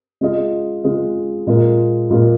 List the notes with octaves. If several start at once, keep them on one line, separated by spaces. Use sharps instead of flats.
C#3 G#3 F4 G#4 D#5
C#3 G#3 F4 G#4 D#5
A#2 G#3 F4 A#4
A#2 G#3 F4 A#4